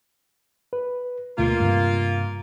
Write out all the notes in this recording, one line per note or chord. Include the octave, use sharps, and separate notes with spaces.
B4
D2 B2 A3 A#3 F4
G2 C3